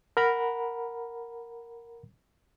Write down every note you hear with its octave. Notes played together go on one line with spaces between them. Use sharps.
A#4 F#5 A#5 B5